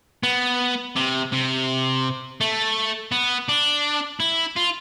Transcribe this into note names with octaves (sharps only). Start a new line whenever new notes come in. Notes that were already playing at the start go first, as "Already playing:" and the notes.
B3
C3
C3
A3
B3
D4
E4
F4